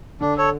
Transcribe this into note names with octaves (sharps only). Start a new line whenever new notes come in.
D3 D4
A4 C#5